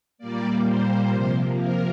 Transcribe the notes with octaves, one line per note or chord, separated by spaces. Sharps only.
A#2 G3 A#3 D5
C5
C3 F3 A#3
A#4